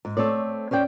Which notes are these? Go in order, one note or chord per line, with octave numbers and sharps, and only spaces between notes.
G#2
A3 C4 C#5 D5
C#4 C5 D5 G5